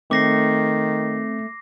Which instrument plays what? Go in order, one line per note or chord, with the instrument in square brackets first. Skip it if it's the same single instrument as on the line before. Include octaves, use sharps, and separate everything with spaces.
[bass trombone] D#3 [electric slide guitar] A3 [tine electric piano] C4 [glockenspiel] D6 A#6 C7